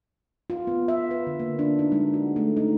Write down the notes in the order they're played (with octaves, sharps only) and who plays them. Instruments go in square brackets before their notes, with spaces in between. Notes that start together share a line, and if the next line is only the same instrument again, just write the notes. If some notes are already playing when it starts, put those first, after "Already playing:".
[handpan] F4
B3
E5
B4
D3
A#3
D4
D#4
G#3
F#4
A3
D#4